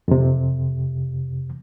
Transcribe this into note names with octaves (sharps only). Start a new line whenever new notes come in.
F2 C3